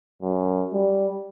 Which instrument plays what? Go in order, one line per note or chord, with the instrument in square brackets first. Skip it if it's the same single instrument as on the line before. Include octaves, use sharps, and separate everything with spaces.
[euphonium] F#2
G3